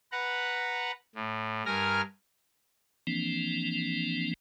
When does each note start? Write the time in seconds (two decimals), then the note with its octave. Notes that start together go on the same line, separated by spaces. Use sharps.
0.12 B4 F#5 A#5
1.15 A2
1.66 G2 A#4 G#5 A#5 F6
3.07 E3 F3 A#3 C4 D4